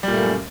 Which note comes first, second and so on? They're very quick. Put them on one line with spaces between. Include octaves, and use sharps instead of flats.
G3 A#2 A3 A#3 F#2